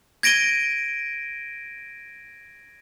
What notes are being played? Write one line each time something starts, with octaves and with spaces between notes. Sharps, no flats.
G#6 A#6 D7 D#7 G7